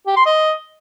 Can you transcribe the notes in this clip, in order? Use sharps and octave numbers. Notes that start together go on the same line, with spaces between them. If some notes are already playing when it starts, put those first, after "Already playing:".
G4
C6
D#5